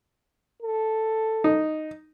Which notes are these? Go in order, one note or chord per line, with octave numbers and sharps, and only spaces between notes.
A4
D#4